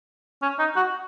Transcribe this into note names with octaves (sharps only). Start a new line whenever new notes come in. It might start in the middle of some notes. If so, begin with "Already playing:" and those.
C#4
D#4
F#4